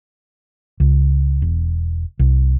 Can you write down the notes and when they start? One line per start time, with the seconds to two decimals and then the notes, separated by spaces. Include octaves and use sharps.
0.80 C#2
1.42 E1
2.19 C2